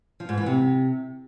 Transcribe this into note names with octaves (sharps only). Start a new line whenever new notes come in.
F3
G#2
E3
C3